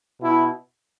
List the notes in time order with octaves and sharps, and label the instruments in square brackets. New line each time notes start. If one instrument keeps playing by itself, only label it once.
[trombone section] B2 E4